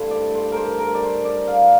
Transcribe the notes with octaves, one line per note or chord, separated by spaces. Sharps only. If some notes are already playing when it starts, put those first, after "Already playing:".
Already playing: G2 D3 A3 E4 C5
D5
C5
A#4 C5
A#4
D5
C5
D5
F5